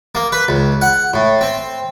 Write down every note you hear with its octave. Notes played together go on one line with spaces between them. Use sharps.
A#3
B4
C#2
F#5
A2
C4